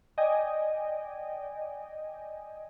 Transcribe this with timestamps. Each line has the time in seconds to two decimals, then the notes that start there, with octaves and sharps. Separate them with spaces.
0.18 D5 D#5 G5 G#5